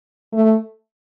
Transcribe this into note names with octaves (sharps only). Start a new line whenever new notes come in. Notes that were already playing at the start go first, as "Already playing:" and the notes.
A3